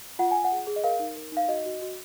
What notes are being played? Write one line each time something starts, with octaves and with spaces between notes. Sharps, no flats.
F4 F#5
F4 G#5
F#5
G#4
G#4
D#5
A#4 F5
D#4
A#4
D#4 F5
F#4 D#5
F#4
F#4